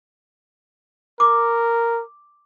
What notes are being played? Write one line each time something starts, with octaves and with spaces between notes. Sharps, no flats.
A#4 D6